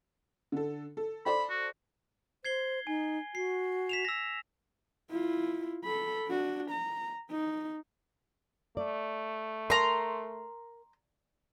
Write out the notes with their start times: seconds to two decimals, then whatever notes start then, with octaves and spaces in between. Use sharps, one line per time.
0.52 D3 A4
0.97 A4
1.26 A4 C5 D5 B5
1.50 F#4
2.45 C5 G#6 C7 G7
2.87 D#4 G#5
3.35 F#4 C7
3.89 B6 E7 F7
4.05 E6 A#6
5.11 E4 F4
5.84 A4 B5
6.28 D4 F#4
6.71 A#5
7.31 D#4
8.77 A3 D5
9.70 A#4 A#5 C6